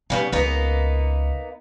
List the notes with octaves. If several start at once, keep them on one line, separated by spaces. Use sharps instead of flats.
C#3 G3 B3 D#4
C#2 A#3 B3 D#4